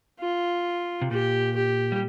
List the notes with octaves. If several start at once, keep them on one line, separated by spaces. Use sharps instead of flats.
F4
C3
A#2 G4
G4
G3